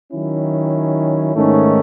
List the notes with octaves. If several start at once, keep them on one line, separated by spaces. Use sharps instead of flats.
D#3 F#3 C#4 E4
G#2 D#3 A3 C#4